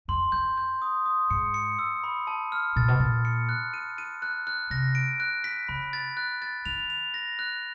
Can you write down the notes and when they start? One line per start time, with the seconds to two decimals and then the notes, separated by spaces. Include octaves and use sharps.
0.08 F2 C6
0.32 F2 G6
0.58 G6
0.82 D#6
1.06 D#6
1.30 G#2 C#7
1.54 C#7
1.79 E6
2.04 B5
2.27 A5
2.52 F6
2.76 A#2 A6
2.88 B2
3.00 A#2 A6
3.25 C#7
3.49 F#6
3.74 D#7
3.98 D#7
4.22 F#6
4.47 F#6
4.70 C3 A#6
4.95 D7
5.20 F#6
5.44 B6
5.69 C#3 B5
5.93 A6
6.17 F#6
6.42 A6
6.65 D#3 F7
6.90 F7
7.14 A#6
7.39 F#6